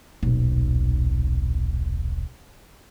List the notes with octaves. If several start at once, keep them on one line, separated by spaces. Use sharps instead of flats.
D#1 B1